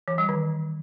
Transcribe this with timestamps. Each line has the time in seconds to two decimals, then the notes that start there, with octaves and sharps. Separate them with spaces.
0.08 E3
0.18 G3
0.29 D#3